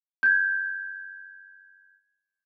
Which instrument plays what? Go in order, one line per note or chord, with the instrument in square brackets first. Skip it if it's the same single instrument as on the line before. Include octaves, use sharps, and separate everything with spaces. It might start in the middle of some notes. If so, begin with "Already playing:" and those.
[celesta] G6 G#6